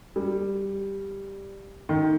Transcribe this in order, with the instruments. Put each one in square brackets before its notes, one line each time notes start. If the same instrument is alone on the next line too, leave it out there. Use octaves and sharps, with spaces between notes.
[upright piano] G3
D#3